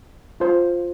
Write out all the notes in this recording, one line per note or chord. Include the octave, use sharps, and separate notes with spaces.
F4 C5